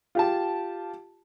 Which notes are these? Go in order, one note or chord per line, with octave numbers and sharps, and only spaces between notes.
F4 G4 A5